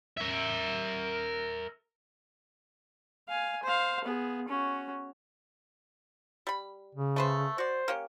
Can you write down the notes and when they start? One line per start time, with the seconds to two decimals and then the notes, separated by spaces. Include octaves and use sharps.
0.17 A#4 E5
3.29 F5 G#5
3.64 C5 F5
4.04 B3 G#4
4.49 C#4 F#4
6.47 G3 B5
6.95 C#3
7.16 A3 B4 C5
7.58 F#4 C5 D5
7.88 A#3 C#4 G4